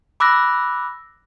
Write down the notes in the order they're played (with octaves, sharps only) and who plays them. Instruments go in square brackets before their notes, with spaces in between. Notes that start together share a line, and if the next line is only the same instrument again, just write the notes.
[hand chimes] B5 D6 E6 F#6 A#6